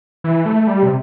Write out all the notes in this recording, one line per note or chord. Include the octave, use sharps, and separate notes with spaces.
E3
A3
G3
C3